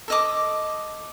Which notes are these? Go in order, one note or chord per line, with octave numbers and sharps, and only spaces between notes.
A4 D#5 D6